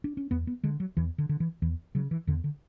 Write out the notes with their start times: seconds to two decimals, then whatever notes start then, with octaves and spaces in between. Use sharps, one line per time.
0.04 D4
0.17 C#4
0.31 E2 B3
0.47 B3
0.63 D3 G#3
0.80 F#3
0.97 E2 E3
1.18 D3
1.29 D3
1.40 E3
1.62 E2 E3
1.95 C#3 F#3
2.11 E3
2.27 E2 D3
2.44 D3